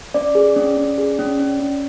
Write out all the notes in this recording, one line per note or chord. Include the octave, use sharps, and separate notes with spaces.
C#4 D5
G#4
C#4
C#4
G#4
C#4
C#4
C#4